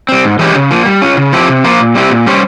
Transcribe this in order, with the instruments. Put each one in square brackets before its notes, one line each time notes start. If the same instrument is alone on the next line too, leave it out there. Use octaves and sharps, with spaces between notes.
[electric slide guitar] G3 C4
G#2
E3 G#3 C#4 G4
C#3
F3 A#3
G3
C#4 F4
C#3
F3 C4 E4 G4
C3
F3 A#3 F4
A#2
G3 C4 E4 G4
A#2
G3 C#4 G4 C5